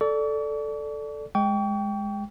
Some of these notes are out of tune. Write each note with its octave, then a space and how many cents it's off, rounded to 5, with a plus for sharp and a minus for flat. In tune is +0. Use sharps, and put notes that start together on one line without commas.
A4 +0 D5 +0 C#6 +45
G#3 +0 G5 +0 C#6 +40